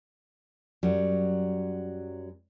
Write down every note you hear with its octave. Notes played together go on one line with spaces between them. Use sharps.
F#2 F#3 G3